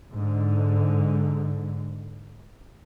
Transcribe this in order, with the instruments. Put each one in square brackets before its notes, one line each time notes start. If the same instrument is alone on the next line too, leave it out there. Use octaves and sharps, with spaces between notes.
[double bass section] G#2 D3